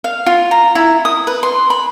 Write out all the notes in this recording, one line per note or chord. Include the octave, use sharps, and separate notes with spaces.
F5
F4
A#5
E4
D#6
B4
C6
B5